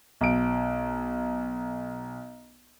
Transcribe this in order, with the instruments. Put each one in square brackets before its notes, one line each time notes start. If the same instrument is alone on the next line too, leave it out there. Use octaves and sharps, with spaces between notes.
[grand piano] B1 D7